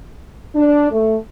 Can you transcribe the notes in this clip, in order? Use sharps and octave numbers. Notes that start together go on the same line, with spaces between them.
D4
A3